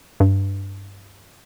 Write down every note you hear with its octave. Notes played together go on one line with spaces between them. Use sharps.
G2